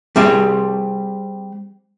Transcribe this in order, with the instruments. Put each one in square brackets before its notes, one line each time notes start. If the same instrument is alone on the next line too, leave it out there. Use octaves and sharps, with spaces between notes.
[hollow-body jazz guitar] G3 C4 G#4 E5